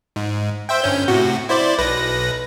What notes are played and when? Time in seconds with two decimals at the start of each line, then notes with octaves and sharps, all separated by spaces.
0.16 G#2
0.69 C5 E5 G5
0.82 G1 C#4 G6
1.08 A2 C3 F#4
1.49 E4 C5 D5
1.78 B1 B4 A#6